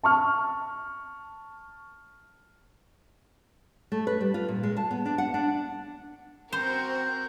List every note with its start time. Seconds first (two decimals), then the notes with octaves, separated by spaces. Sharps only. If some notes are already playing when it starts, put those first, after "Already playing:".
0.03 A5 C#6 F6
3.92 A3
4.07 B4
4.21 G3
4.34 F4
4.48 A#2
4.63 G#3
4.76 A5
4.91 B3
5.06 D4
5.18 F#5
5.34 D4
6.53 C4 F#4 A#4 C5 G6